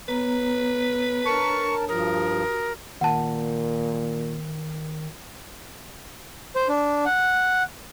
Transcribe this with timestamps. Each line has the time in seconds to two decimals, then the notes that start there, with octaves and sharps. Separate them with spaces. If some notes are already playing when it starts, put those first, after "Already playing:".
0.09 B3 B4 C#5 A#5
1.26 D4 A#4 C#5 A5 C#6
1.88 G2 F3 F#4 G4 A#4 D#6
3.01 A#2 D#3 F#5 A5
6.55 C5
6.69 D4
7.05 F#5